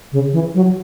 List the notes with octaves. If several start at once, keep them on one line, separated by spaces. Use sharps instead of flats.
C#3
E3
F#3